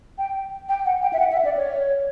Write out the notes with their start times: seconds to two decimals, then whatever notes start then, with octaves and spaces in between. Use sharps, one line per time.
0.18 G5
0.69 G5
0.85 F#5
1.02 G5
1.13 E5
1.19 F#5
1.32 E5
1.45 D5
1.57 C#5